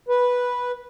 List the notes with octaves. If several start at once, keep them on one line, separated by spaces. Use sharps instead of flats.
B4